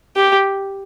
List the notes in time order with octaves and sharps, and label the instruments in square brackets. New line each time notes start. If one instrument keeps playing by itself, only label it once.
[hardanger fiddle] G4